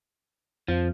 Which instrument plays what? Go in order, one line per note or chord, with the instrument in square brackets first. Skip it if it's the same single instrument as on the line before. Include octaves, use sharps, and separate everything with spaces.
[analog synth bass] F2 [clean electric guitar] F3